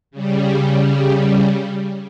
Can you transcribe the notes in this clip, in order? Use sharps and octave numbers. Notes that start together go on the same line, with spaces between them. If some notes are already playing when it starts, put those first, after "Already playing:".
C#3 G3